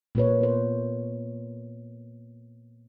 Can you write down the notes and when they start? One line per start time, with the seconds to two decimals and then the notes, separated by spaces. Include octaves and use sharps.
0.15 A#2 A#3 B4 C#5
0.41 B3 C5